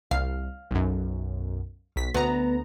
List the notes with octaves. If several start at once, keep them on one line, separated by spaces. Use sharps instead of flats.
C2 F5
B1 F#2
B1 B6
D2 B3 A#5